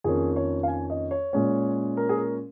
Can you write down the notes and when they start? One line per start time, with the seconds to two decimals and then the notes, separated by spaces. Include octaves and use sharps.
0.04 F2 D#3 A#3 C#4 G#4
0.36 C#5
0.63 F5
0.68 G#5
0.90 D#5
1.11 C#5
1.33 A#2 G#3 C#4
1.97 A#4
2.09 G#4
2.18 A#4